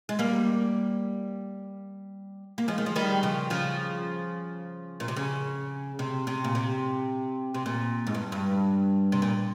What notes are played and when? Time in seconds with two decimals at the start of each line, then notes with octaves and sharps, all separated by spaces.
0.09 G#3
0.19 G3 A#3
2.58 A#3
2.68 F3 G#3
2.78 D#3
2.86 F3
2.96 D#3 G3
3.23 C#3 F3
3.50 C#3 F3
5.00 A#2
5.08 C3
5.16 C#3
5.99 C3
6.27 C3
6.44 A#2
6.55 C3
7.54 C3
7.66 A#2
8.07 G#2
8.15 G2
8.32 G2
9.12 C3
9.22 A#2